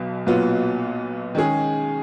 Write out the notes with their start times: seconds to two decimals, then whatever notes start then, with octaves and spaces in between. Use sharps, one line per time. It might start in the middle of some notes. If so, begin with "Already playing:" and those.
Already playing: B1 B2
0.26 B1 A#2 F#3 B3 F4
1.35 D#3 G#3 C#4 G#4